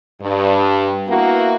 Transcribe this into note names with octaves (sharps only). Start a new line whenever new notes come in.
G2
A#3 B3 E4 F#4